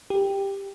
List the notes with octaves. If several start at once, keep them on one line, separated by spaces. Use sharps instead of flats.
G4